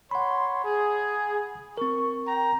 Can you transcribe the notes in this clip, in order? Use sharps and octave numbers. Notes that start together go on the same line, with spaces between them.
C#5 F#5 B5 C6
G#4
C4 A#4 C#6
G5 A#5